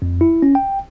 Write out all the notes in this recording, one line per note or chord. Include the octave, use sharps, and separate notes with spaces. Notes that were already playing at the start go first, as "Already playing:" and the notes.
F2
E4
C#4
G5